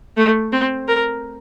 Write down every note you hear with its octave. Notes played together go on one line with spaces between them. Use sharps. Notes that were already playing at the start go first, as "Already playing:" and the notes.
A3
C4
A#4